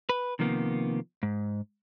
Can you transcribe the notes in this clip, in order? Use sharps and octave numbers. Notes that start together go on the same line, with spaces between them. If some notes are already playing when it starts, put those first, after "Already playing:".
B4
C3 D#3 F3 A#3 B3
G#2